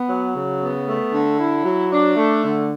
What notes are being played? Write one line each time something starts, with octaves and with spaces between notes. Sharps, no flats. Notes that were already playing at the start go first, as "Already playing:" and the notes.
Already playing: B3
F#3
C#3
B3
A3
D3
E4
F#3
D4
A3
D3